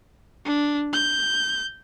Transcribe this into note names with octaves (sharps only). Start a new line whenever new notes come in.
D4
G6